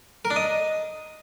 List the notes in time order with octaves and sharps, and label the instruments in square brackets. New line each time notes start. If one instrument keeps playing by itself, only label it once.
[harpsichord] A#4
D4
D#5